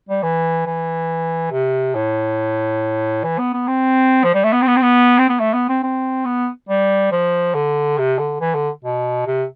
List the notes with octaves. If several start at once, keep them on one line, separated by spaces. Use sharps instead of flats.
G3
E3
E3
C3
A2
E3
B3
B3
C4
F3
G3
A3
B3
C4
B3
C4
B3
C4
B3
A3
B3
C4
C4
B3
G3
F3
D3
C3
D3
E3
D3
B2
C3